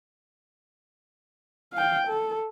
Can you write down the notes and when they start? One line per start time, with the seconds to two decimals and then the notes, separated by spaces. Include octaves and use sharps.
1.73 F5 G5
2.07 A4